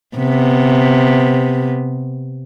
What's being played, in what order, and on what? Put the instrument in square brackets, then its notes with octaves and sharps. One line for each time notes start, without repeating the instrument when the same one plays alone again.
[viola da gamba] C3 B3